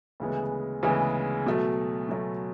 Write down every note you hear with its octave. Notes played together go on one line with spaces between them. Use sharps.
D2 C#3 E3 G#3 B3
D2 C#3 E3 G#3 B3
B2 F#3 A3
B2 F#3 A3